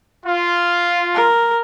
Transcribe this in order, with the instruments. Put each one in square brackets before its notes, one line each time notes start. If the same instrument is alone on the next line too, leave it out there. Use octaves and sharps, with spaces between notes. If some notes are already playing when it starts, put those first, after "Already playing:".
[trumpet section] F4
[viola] A#4